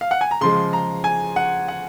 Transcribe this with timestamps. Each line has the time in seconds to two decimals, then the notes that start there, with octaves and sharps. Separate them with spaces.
0.01 F5
0.11 F#5
0.21 G#5
0.31 A#5
0.41 C#3 F3 G#3 C6
0.73 A#5
1.04 G#5
1.36 F#5
1.68 F#5